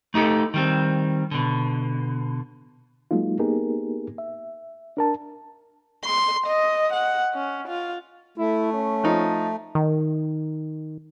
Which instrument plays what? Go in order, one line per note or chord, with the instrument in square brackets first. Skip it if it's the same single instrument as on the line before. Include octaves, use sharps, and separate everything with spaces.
[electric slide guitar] A3 D#4 G4 A4
D#3 G3 C4
B2 D3
[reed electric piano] F#3 G#3 A#3 D#4 F4
A#3 B3 D#4 G4 G#4 A#4
E5
D4 A#4 A5
[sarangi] C6
D#5
F#5
C#4
F4
[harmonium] A3 [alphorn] E4
[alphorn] C#4
[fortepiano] F3 D#4
[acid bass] D#3